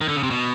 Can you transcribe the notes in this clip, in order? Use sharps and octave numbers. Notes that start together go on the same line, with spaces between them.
D#3
D3
C#3
C3
B2